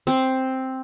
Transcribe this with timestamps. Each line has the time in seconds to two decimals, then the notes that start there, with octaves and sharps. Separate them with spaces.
0.07 C4 C5